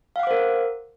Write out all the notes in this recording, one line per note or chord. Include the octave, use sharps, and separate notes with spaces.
A#4 C5 F5 F#5 D6